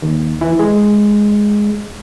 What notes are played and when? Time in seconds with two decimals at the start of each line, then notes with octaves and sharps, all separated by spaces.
0.02 D#2
0.41 E3
0.59 G#3